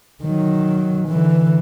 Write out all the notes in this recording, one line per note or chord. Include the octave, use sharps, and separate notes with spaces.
D#3 F#3
D3 E3